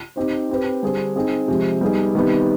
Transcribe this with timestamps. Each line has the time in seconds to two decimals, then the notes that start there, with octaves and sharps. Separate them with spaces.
0.16 C4 D#4 G4 C5
0.50 C4 G4 B4
0.83 D3 G3 D4 G#4 C5
1.16 C4 D#4 G#4
1.48 C3 F3 G#3
1.81 G3 B3 D#4 G#4
2.15 C3 D#3 G3 B3